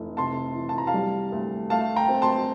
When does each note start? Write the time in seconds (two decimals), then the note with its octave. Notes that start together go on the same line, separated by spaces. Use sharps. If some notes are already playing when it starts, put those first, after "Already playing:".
Already playing: F1 E3
0.17 C3 A5 C6
0.55 E3
0.69 A5
0.78 A#5
0.87 F5 A5
0.94 G3
1.32 D2
1.70 A3 F5 A5
1.96 G5 A#5
2.08 C4
2.22 A5 C6